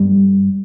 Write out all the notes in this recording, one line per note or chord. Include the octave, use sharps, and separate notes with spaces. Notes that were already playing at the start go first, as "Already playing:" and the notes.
Already playing: G1 G2 G3